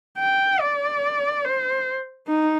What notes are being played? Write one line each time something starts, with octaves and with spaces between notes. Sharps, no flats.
G5
D5
C5
D#4